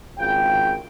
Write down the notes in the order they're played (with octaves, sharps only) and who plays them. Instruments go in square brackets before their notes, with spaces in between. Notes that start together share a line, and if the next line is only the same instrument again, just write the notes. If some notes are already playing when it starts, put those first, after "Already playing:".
[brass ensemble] G#1 C#3 F4 G5